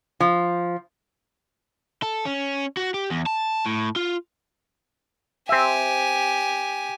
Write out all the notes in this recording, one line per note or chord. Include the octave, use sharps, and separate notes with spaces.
F3
A4
C#4
F#4
G4
E2
A5
A2
F4
C4 G4 E5 G#5